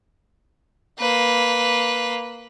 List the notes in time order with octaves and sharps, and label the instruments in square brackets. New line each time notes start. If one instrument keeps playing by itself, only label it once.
[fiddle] A#3 B4